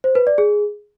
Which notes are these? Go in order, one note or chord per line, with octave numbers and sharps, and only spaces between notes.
C5
B4
D5
G#4